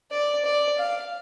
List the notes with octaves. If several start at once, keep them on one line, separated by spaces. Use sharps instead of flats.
D5
D5
F5